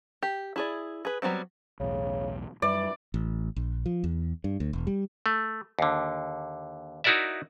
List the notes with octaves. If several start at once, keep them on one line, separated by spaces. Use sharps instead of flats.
G4
E4 G#4 D5
G#4 B4
F#3 G3 B3 C4
B1 E2 A2 C#3
F#2 E3 G3 D5
A1
A#1
F3
E2
G2
D2
E1
G3
A3
D#2 D3
D#4 E4 F#4 A#4 D5 E5